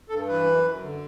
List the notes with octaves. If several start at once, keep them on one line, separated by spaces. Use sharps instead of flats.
G2 A4
E3 B4
F#2
F#2
D3